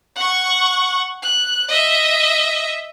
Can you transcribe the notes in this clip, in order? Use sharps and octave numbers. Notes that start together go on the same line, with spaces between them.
F#5 C#6
F#6
D#5 E5